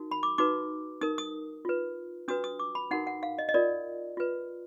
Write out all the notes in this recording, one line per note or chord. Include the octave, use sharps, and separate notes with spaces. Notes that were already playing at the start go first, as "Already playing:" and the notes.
Already playing: D#4 F#4 A#4
B5
D6
D#4 F#4 B4 D6
D#4 A#4 D#6
D#6
F4 B4
D4 F#4 B4 D#6
D#6
D6
B5
D#4 F#4 A#4 F#5
F#5
F5
D#5
D#5
F4 A#4 D5
F4 B4